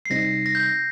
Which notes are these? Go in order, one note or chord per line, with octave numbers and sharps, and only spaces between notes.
C7
C3 G3 C4 D#4 A#6
A#6
G6
A#6